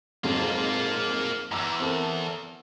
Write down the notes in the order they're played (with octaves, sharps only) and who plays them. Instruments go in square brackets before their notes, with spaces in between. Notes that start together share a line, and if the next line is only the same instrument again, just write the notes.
[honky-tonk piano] F2 G#2 F#3 [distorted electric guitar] A#3 F4
[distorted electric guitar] E2 G#2 [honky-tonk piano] A#5 D6 E6
[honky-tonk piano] C4 A4 A#4